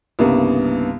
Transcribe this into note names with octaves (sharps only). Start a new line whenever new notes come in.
C2 G2 C#3 A#3 B3